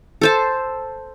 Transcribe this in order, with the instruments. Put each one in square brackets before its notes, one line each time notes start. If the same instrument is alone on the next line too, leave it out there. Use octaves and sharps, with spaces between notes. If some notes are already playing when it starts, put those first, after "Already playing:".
[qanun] A4 C5 A5